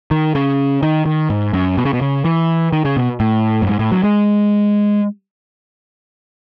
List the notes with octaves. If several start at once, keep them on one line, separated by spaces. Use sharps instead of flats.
D#3
C#3
D#3
D#3
G#2
F#2
B2
C#3
B2
C#3
E3
D#3
C#3
B2
A2
F#2
G#2
A2
F#3
G#3